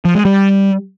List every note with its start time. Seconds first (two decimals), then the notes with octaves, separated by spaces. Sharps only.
0.05 F3
0.15 G#3
0.25 G3